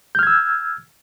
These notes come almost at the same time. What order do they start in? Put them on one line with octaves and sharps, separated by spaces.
G6 F6 G#6 E6